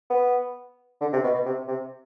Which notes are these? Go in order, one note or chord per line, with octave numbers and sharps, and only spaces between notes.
B3
D3
C3
B2
B2
C3
C3